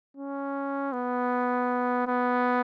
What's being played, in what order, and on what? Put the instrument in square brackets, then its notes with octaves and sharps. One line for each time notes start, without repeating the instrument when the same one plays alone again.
[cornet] C#4
B3
B3